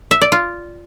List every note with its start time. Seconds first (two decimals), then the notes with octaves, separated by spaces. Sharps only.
0.11 E5
0.21 D5
0.32 F4